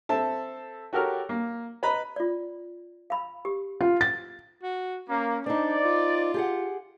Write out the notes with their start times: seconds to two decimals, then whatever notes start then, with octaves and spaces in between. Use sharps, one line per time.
0.09 C4 A4 E5 A5
0.93 F#4 G4 A4 A#4 C#5 F6
1.29 A#3
1.83 B4 D#5 A#5 B5
2.16 F4 D5
3.10 F5 B5
3.45 G4
3.81 F4
4.01 A6
4.63 F#4
5.10 A#3 C#4
5.46 C4 D4 D#4 D5
5.85 F4
6.34 G4 G#4 F#5